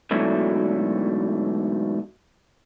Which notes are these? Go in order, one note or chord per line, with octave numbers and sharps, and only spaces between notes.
G#2 B2 D3 E3 F#3 A3